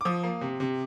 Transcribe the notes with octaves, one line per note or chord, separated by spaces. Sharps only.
D6
F3 D#6
A#3
C3
C3